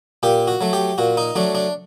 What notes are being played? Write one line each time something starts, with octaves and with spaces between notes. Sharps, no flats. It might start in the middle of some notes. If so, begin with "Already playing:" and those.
A#2 G4
F#4
F#3 A3
G4
A#2 F#4
D#4
F#3 A3 D4
D4